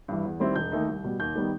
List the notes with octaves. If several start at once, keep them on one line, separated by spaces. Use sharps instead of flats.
G2 E3
E2
D#3 G3 C4 E4
E1 G6
D#2 D#3 A3 D#4
C2
B2 G3
D#2 G6
D#3 G3 B3 D#4